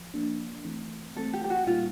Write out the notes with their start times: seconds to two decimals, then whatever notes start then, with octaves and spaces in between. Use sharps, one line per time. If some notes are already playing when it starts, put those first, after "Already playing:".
Already playing: F3
0.14 F3 A#3 D4
0.65 E3 A3 C4
1.16 E3 A3 C4 A4
1.33 G4
1.44 G4
1.50 F#4
1.67 A#2 G3 A#3 D#4 F4 F#4